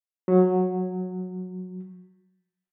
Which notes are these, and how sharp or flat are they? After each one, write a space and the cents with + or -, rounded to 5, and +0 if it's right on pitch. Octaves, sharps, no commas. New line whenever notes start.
F#3 -15